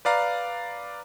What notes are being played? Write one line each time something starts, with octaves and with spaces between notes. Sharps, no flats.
B4 D5 F5 A#5